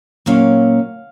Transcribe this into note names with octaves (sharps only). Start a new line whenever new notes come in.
A#2 F#3 A#3 C#4 F5